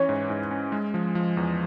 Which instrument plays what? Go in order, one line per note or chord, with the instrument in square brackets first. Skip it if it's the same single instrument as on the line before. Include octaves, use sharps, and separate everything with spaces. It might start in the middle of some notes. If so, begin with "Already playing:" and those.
Already playing: [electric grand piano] E3 C#4 [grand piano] C#5
[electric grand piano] G#2
G#2
C#4
G#3
F3
F3
E2